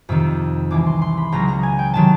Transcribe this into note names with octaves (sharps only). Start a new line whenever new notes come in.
F2 C3 D#3 E6
C2 C3 E3 G#3 D6
C6
C6
B5
C#2 C#3 F#3 B3 A#5
A#5
G#5
G5
C3 D#3 F#3 A5